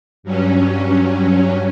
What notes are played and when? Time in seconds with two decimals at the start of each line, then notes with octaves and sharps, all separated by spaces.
0.23 G2 F#3 C#4